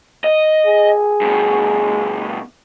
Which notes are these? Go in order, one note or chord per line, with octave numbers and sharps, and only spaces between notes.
D#5
G#4
G2 B2